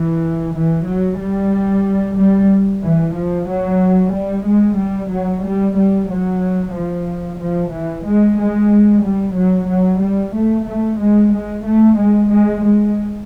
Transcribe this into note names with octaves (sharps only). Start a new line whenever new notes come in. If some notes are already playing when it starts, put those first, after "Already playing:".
Already playing: E3
E3
F#3
G3
G3
E3
F3
F#3
G3
G#3
G3
F#3
G3
G3
F#3
F3
F3
E3
G#3
G#3
G3
F#3
F#3
G3
A3
A3
G#3
G#3
A3
G#3
G#3
G#3